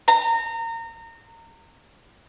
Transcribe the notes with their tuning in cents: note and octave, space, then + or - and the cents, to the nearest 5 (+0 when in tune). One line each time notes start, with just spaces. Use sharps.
A#5 -25